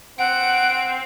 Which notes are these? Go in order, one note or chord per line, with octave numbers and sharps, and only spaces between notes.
C4 F#5 D7